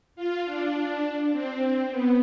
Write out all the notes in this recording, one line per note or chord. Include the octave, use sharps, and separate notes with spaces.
F4
D4
C4
B3